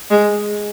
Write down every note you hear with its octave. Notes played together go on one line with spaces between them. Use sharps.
G#3